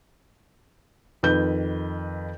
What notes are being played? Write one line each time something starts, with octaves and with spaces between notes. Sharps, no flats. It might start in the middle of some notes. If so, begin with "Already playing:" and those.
F2 D#3 B4 G6